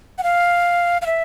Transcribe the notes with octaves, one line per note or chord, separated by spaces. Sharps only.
F#5
F5
F5
E5